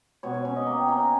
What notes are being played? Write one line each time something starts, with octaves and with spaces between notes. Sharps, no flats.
B2 C#5
C#5
C#4 C#5
D#5
A#3
G5
C#4 A#5
G#5